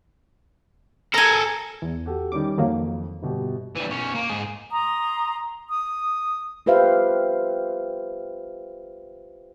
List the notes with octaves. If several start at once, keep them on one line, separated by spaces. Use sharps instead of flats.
A4 A#4 G#5 A#5
E2
F#4 G4 A4
D#3 G3 C#4 D6
F2 D#3 F#3 A#3
G1 B2 G4
E3 G3
B1 C#4
A#3
G#2 G#4
A#5 C6 D#6
D#6
F4 G4 B4 C5 E5 F5